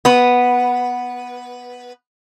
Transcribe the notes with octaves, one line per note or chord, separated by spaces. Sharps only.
B3 B4